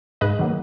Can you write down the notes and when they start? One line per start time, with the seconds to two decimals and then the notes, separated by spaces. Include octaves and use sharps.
0.21 G#2 B4 D#5
0.39 D#3 F#3 A#3